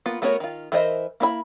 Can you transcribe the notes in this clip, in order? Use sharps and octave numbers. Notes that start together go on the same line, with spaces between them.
A#3 B3 F4
A3 B3 F#4 A#4 C#5
D#3 F4
E3 A#4 C5 D#5 E5
A#3 E4 B5